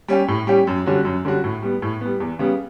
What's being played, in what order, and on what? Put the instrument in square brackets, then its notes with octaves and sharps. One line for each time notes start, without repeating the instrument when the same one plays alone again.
[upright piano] G3 C#4 G4
A2
G3 C#4 G4
F#2
D3 G3 C#4 F#4
F#2
D3 G3 C#4 F#4
A2
G3 B3
A2
G3 B3
E2
C#3 G3 B3